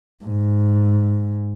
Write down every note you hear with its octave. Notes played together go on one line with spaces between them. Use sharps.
G#2